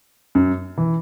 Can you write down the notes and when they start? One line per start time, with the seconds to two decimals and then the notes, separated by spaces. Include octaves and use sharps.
0.35 F#2
0.77 E3